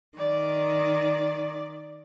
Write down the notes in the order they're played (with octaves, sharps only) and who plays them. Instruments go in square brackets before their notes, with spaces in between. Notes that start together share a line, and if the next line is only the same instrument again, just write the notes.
[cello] D#3 [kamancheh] D5